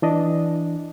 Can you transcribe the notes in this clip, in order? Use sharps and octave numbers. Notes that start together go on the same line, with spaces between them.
E3 D4 D#5